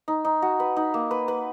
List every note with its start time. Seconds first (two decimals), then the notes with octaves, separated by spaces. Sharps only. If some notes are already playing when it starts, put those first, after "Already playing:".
0.08 D#4
0.25 D#4
0.42 F#4
0.60 B4
0.77 D#4
0.94 A#3
1.11 B4
1.28 B4